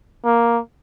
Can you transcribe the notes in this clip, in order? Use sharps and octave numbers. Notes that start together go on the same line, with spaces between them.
A#3